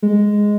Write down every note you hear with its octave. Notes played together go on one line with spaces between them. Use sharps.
G#3